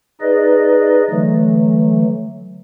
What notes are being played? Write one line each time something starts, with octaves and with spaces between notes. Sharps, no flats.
D#4 G#4 B4 D5 D#5
D3 E3 F#3 A3